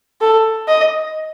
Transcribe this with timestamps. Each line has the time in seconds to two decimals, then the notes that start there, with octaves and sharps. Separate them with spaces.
0.21 A4
0.68 D#5